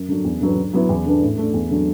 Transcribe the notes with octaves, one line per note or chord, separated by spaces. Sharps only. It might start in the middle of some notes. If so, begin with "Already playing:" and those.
Already playing: F#2
D3 F#3
E2
D3 F#3 B3
D3
F#3 B3 E4
E2
D3 B3 D4
A2
A3 D4
E2
D3 F#3